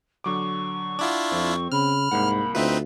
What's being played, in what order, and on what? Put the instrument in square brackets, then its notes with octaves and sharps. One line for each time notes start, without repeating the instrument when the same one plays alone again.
[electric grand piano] D3 F#3 D6 [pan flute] C#6
[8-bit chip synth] D4 E4 F4 [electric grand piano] F#5 D6
[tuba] F2 [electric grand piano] C4
[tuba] C#3 [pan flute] B5 [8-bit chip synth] F6
[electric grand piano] C2 A#3 F#5 [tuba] G#2
[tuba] D2 [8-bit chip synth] C4 D#4 B4 [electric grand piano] F4 E5